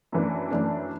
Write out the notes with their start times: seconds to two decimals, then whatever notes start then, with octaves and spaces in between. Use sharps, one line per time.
0.12 F#2 E3 A3 D4
0.51 F#2 E3 A3 D4